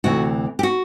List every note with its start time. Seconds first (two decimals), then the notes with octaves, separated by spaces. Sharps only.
0.04 D2 C3 E3 F#4
0.59 G4
0.63 F#4